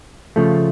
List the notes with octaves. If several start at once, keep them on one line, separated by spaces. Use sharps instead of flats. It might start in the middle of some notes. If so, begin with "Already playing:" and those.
C#3 F3 A3